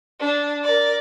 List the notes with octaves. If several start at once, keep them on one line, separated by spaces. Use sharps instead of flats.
D4
A#4 D5